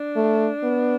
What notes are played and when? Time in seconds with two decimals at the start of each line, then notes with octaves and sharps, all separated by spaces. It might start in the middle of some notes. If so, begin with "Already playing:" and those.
Already playing: D4
0.16 A3
0.63 B3